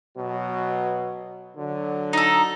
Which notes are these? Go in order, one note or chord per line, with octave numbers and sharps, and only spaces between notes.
B2 F#3
D3 F#3
D#4 A4